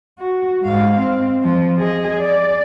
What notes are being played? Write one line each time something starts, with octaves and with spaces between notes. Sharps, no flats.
F#4
G#2 F5
C4
F3
G#4 D#5
D5